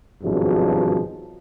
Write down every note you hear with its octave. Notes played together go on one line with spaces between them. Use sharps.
G#1 G2 B2 F3 F#3 G#3